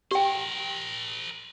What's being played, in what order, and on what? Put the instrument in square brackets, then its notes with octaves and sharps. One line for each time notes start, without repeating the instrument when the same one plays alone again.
[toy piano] G4 G5 [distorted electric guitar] A#4 C5